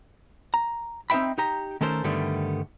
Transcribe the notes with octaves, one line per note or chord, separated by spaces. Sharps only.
A#5
C4 D#4 C5 E5 G5 B5
D#4 G4 A#5
D#3 A3 C#4 A4 A#4 C5
G2 D3 D#3 G3 A3 B3